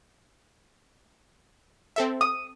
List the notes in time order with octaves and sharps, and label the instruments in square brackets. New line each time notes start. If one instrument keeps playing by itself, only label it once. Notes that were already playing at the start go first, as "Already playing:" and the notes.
[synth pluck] C4 A4 E5
[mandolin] D#6